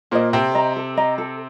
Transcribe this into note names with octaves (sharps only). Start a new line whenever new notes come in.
A#2 A#3 C5 D#5
C3 C4 A4
D#5 A#5
A4
D#5 A#5
A4